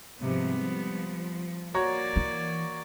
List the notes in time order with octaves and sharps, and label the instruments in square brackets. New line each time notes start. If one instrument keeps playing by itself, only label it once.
[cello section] G#2 C3 F3 [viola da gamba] G3 B3
[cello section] F3
[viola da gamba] A#3 D5 [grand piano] F#4 C#5 A#5
[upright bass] E3